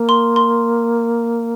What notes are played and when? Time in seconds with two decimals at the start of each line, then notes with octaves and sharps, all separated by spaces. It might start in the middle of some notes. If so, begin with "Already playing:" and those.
Already playing: A#3
0.09 C6
0.36 C6